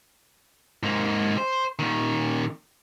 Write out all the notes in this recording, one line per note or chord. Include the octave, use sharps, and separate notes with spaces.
G#2 A#3
C5
A#2 D#3